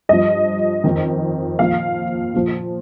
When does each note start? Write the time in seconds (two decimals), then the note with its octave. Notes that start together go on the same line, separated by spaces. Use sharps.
0.09 G2 F3 D#5
0.84 F2 D#3
1.59 A#2 F3 F5
2.34 A#2 F3